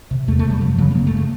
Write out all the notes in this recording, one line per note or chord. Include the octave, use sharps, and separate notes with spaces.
C3
E2 A3
A3
C3
G3
F#2 F3
C#3 F#3
B3
F#2 A#3
A3
C#3
A3